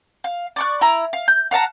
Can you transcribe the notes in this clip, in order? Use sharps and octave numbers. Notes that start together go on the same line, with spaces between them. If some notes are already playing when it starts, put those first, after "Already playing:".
F5
D5 C#6 F#6
E4 A#5
F5
G6
F5 F#5 A5 A#5